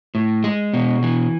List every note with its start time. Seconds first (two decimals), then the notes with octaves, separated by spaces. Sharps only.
0.15 A2
0.44 G#3
0.73 B2
1.03 E3